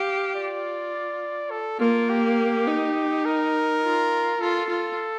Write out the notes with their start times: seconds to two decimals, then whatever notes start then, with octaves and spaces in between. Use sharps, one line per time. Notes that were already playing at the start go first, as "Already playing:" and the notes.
Already playing: G4 F5
0.35 F4 D5
1.51 A4
1.80 A#3 F4
2.10 G4
2.67 D#4
3.25 A#4
3.83 F4
4.41 F4 A4
4.70 F4